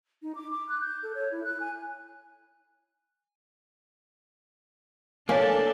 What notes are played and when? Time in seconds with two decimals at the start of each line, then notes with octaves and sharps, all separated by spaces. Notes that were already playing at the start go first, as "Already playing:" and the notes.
0.22 D#4
0.35 D6
0.51 D6
0.69 F#6
0.81 G6
1.03 A4
1.15 C#5
1.32 E4
1.44 F#6
1.60 G#5
5.29 A#3 D4 A4 C#5 F5 G#5